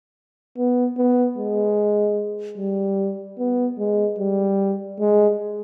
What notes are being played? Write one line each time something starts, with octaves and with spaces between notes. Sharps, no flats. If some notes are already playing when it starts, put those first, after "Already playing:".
B3
B3
G#3
G3
B3
G#3
G3
G#3